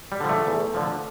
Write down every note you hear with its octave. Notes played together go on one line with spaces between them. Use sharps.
G3
D3 F3
A3
E2
D3 F3